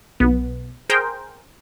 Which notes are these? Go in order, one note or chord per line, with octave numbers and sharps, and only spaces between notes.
B1 B3
G#4 A#4 C5 G5